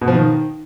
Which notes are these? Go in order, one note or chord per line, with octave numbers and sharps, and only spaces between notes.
B2
F3
D#3